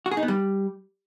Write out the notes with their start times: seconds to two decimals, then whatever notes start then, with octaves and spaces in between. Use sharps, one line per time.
0.06 F#4
0.11 G#4
0.17 D#4
0.23 B3
0.28 G3